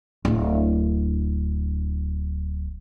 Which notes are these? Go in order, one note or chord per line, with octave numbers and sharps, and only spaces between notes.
D1 D4